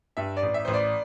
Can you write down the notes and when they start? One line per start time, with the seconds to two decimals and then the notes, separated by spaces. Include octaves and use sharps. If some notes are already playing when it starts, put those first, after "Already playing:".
0.17 G2 E5
0.36 D5
0.42 A1
0.54 E5
0.65 A1 C5
0.74 D5